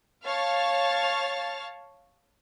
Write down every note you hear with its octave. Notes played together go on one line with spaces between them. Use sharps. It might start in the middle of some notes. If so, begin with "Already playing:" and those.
C#5 F5 A5 F6 A6